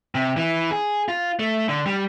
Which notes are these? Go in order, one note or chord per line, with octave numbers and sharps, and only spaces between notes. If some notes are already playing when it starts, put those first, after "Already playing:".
C3
E3
G#4
F4
A3
D3
G3